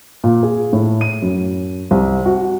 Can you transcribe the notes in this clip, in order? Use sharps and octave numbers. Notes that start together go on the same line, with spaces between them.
A#2
G#4
A2
D#7
F#2
C2
F#4